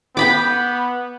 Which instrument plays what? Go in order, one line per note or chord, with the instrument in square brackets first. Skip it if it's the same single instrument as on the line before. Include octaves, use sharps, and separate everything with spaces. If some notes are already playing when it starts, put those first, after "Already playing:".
[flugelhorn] B3 [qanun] G5 B5 D6